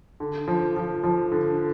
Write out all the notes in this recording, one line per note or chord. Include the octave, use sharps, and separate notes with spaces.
D3
F3
F3
F3
D3